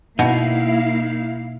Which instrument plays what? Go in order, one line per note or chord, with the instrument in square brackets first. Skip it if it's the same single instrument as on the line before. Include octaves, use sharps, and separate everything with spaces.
[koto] B2 [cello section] A#3 E4 F5 [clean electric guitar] D#4